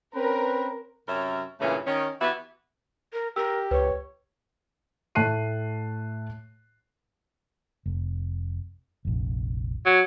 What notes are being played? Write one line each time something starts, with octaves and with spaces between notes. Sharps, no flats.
C4 C#4 A#4 B4
F#2 C3 C#4 A#4 E5
G2 A#2 C#3 E3 A3 C#4
D#3 C#4
E3 B3 F#4 G4 E5
A#4
G4 A#4 E6
C#2 B4 C#5
A2 A3 A5 F#6 C7 D#7
F1
F1 A#1
F#3